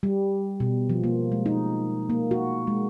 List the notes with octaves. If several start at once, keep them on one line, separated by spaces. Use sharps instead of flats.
G3
B2
F3
A#3
G#3
D#4
A#3
F#4
G#3